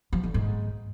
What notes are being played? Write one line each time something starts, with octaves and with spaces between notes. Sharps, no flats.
F3
D3
G#2